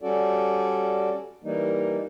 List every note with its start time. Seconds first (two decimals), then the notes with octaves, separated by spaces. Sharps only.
0.01 G3 C#4 F#4 A4 D5
1.44 E3 G3 A#3 D#4